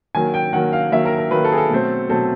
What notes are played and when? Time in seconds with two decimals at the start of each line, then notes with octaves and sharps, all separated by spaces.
0.15 D#3 F#3 A#3 G#5
0.34 G5
0.53 D#3 F#3 A#3 F#5
0.73 F5
0.92 D#3 F#3 A#3 E5
1.05 A#4
1.18 A#4
1.31 D#3 F#3 A#3 B4
1.45 A4
1.52 G#4
1.58 A4
1.70 B2 F#3 A3 C4
2.09 B2 F#3 A3 C4 A4